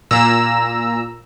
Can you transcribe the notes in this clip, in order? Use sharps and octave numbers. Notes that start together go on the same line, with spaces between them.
A#2 A#5 E6